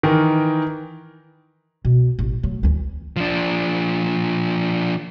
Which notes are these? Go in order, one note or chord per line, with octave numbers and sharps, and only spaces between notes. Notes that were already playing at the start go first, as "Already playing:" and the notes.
D#3 E3 A#4
B2
A1
F#3 A3
D2 E3
F3 D4